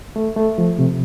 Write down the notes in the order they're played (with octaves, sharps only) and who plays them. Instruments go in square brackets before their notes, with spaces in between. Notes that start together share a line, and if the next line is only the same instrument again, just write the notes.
[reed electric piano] A3
A3
F3
C3